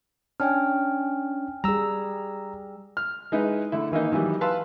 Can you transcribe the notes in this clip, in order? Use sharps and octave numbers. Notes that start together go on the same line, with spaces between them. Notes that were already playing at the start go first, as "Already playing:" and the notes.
C#4 D4 G5 G#5 F6
G3 G#4 A#5 E6
F6
G#3 D#4 E4 B4
D3 A3 E4
D#3 E3 A#3 D#4
D#3 E3 F#3 G3
B4 F5 A5 C6 E6